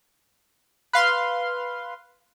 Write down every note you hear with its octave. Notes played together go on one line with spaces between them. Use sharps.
B4 F5 C6